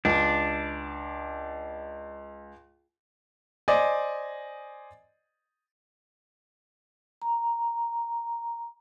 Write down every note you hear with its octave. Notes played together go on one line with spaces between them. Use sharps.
C#2 D4
C5 D5 D#5 G#5
A#5